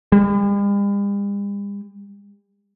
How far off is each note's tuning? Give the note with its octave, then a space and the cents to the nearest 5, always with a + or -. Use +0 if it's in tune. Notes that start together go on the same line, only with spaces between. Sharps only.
G3 +45